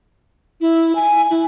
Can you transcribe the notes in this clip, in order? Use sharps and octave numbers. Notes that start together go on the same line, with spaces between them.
E4
G#5
E4